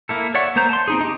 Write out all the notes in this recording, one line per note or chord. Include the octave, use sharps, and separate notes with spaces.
A#3 E4 A4
C#5 D5 E5 F#5 C#6
A#3 B3 C5 A#5 G6
A5 C6
C4 D#4 G#4
D#4 G4